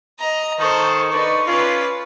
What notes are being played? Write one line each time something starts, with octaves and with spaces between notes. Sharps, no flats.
D#5 A#5
D#3 A4 C5 C#6
D3 D#4 B4 D5
C#4 F4 B4 D5